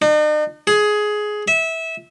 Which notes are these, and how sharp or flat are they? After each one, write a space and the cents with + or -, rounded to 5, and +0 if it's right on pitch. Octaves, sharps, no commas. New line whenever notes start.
D#4 -45
G#4 +15
E5 -20